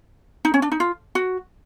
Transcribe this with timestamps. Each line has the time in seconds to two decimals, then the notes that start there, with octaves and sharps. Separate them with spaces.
0.45 D#4
0.54 C#4
0.62 D4
0.72 D#4
0.80 F4
1.15 F#4